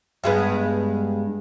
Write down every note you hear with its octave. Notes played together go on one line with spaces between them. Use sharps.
G2 G#3 B3